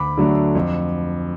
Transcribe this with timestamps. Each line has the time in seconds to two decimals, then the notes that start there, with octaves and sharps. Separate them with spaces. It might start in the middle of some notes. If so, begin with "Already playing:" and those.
Already playing: D2 B5 D6
0.17 D3 F#3 A3 D4
0.55 F2